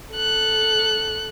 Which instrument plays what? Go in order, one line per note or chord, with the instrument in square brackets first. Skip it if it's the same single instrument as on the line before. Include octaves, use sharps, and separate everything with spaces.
[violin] A4 F#6